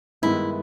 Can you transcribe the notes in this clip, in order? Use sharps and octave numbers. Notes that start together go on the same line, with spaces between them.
G2 D#3 G#3 B3 E4